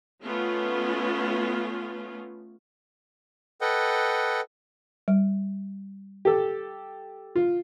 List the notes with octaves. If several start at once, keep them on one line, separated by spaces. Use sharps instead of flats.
A3 B3 C#4 F4
A4 B4 D#5 F#5 G5
G3
G4 A4
F4